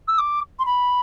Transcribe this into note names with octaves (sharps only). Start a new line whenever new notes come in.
E6
D6
C6
B5